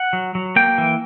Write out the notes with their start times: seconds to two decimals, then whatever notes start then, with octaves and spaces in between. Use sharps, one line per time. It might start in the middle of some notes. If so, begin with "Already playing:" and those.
Already playing: F#5
0.13 F#3
0.35 F#3
0.56 A#3 G5
0.78 E3